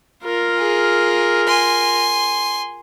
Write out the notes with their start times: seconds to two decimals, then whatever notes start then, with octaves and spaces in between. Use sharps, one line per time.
0.23 F4 A#4
0.58 G#4
1.47 G#5 C6